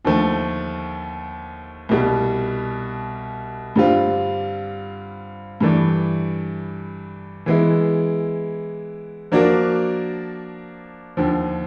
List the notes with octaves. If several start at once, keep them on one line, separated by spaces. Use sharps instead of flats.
D#2 D3 F3 A3
C2 B2 G3
G2 D3 G3 C4 F4
G2 E3 A3 D4
E3 G#3 B3 E4
F3 A#3 D4 F#4 A#4
D#2 D3 F3